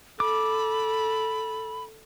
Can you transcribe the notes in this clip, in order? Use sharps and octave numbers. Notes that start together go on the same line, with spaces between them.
A4 B5 D6